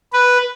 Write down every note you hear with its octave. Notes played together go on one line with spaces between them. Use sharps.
B4